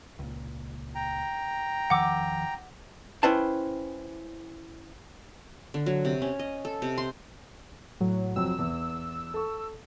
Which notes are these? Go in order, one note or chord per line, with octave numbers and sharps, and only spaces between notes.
C#2 A#2
G5 A#5
E2 D#3 F3 F#5 D6 E6
C#4 E4 B4 C5 G5 A5
D3
F#3
C3
C#4
D#5
A4
C3
C6
A2 F#3
F2 F#3 C4 E6
E2
A4 C#6